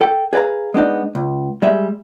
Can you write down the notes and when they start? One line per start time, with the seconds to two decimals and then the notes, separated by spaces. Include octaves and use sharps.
0.01 A4 G5
0.33 G#4 B4 D5 F5 A#5
0.74 G#3 B3 D4 D#4
1.15 C#2
1.62 G3 G#3 E5